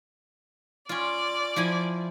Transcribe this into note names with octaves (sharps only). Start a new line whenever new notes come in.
C#4 F4 D5
F3 E4 G#5